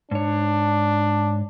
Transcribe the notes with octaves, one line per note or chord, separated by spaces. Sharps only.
G#2 D4 C#5